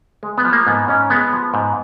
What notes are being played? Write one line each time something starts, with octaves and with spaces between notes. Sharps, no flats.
G#3
B3
F3
A#3
G#2 B3
G#2 C#4
G#3 B3
F3
G#2